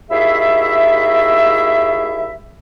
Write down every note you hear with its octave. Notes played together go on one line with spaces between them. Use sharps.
D#2 E4 F#4 G#4 E5